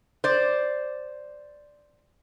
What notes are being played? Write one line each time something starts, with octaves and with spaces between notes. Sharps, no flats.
C5 D5